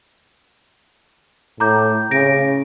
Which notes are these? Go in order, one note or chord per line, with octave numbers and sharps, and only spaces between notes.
A2 A#5 D6 G6
C#3 A#6 D7